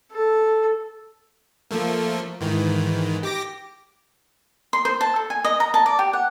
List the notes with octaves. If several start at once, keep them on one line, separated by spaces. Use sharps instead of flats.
A4
F3 A3 A#3
G#2 D#3 E3
G4 D6 A#6
C6
C5
A5
A4
G#5
D#5
A#5
A5
D5
G4
F#5